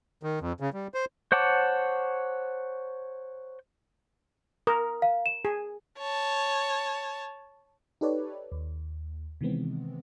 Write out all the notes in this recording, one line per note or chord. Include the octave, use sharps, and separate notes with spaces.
D#3
F2
C#3
G3
C5
C5 C#5 F#5 A5 D6
A#4 D#6
F5
E7
G#4
C#5 A5
D#4 G4 A4 B4 C#5 D5
D#2
C3 D#3 E3 G#3 B3 C4